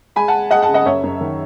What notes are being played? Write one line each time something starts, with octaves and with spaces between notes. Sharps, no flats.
G#3 G#5 B5
F#5 A5
G#3
G#3 D#5 F#5
F#5 A5
C#3
D#5 F#5
F#2 C#5 E5
F#2
D#3